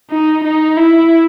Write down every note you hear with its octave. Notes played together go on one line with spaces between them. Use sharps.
D#4
D#4
E4